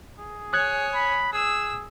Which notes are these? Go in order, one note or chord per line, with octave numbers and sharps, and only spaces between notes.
G#4
C#5 G#5 D#6 F#6 G#6
B5
G#4 E6